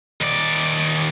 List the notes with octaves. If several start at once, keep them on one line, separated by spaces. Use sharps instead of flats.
D#2 D5